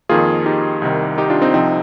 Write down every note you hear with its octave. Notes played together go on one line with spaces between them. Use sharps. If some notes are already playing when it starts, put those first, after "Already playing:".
F2 D#3 A#3 F4 G#4
D#4 G4
C2 C3 D#3
D#4 G4
D4 F4
C4 D#4
C2 C3 F3 C4 D#4